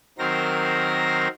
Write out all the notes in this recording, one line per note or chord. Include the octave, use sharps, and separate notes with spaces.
D#3 F#3 C4 A#4 C5 A#6